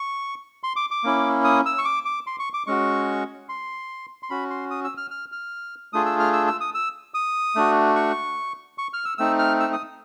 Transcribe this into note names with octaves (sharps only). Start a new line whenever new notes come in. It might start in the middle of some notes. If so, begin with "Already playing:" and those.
Already playing: C#6
C6
D6
D6
A#3 C#4 E4
D#6
E6
C#6
D6
D6
C6
C#6
D6
G#3 C#4 F#4 C#6
C6
C6
C#4 F#4 B5
C6
D#6
E6
F6
F6
F6
A3 D4 F4 G#4 D#6
E6
F6
E6
E6
D#6
E6
D#6
A3 D4 F#4
C#6
C#6
F6
E6
A3 C4 D#4 E6
F6
E6
D#6